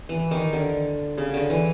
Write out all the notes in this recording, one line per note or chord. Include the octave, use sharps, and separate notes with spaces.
E3
D#3
D3
C#3
D3
E3